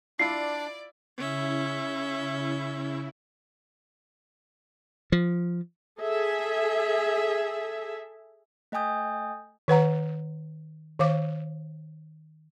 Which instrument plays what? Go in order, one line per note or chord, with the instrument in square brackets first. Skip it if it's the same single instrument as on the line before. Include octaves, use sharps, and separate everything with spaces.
[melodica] D4 [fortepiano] E4 F4 [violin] D5 [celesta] C7
[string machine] C#3 E4 [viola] C#4 E5
[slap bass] F3
[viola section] G#4 A4 E5
[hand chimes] A3 D#5 G5 G#5 D#6 G6
[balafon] D#3 B4 F#5 A#5
D#3 C5 F5 D6